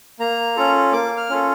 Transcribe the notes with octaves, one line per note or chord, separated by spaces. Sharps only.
A#3 A#5
C#4 F4 A4
A#3 D6
F6
C#4 F4 A4